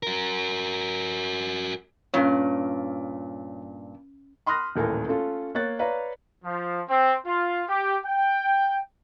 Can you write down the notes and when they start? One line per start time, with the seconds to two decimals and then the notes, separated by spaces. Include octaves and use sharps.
0.03 F#4 A#4
2.14 G2 A#2 C#4 C#5 F5
4.46 B5 C6 D#6 F6 F#6 A#6
4.76 D#1 A1 A4 A#4 G#5
5.08 A3 C#4 F4 A4
5.55 A#3 C#5 F#6 A6
5.79 B4 C#5 D5 F5 A#5
6.44 F3
6.89 C4
7.26 F4
7.69 G4
8.05 G5